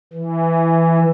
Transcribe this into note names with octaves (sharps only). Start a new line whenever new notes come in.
E3